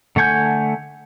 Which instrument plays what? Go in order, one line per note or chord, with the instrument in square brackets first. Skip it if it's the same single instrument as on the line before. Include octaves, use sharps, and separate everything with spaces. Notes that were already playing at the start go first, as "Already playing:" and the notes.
[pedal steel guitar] D3 A3 F#5 G#5 G6